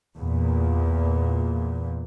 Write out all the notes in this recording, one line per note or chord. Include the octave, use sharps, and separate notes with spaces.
E2 A#2